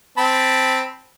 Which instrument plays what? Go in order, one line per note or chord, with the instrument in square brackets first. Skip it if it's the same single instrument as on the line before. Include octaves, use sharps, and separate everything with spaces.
[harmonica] C4 A5 B5